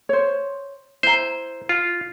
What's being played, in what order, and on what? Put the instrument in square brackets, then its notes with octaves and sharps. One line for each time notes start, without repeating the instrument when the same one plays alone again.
[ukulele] C5 C#5
[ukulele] E4 A#5 [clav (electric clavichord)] C5
[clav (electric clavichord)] F4